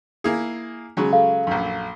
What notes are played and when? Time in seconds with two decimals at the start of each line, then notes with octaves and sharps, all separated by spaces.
0.24 A#3 E4 G#4
0.97 C#3 F#3 G#3
1.13 A4 F5
1.47 A#1 F#2